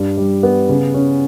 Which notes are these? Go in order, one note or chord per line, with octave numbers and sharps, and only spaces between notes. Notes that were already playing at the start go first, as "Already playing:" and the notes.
Already playing: G2
G3
B3
C#3
C#4